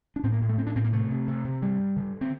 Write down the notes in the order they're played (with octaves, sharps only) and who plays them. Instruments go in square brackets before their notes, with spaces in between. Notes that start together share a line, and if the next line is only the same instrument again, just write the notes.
[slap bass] D4
A2 C4
A#3
A2
A3
A2 C4
D4
A2 C4
A#3
C3 A3
C3
C3
C3
G2 G3
G2
D3
G2
C4